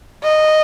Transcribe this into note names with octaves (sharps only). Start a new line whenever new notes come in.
D#5